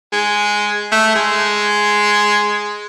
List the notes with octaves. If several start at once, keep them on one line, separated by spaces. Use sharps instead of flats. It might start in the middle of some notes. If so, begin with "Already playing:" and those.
G#3
A3
G#3